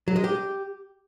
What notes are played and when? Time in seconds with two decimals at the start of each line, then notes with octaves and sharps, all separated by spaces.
0.08 F#3
0.16 G#3
0.24 G4